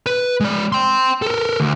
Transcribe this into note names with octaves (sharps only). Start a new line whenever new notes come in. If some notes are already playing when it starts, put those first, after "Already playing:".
B4
G#3 D5
G5 C6
A4 A#4
D2